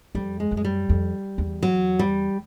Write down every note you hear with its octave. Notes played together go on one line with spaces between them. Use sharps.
F2 G3
G#3
F#2
G#3
G3
F2
E2
F#3
G3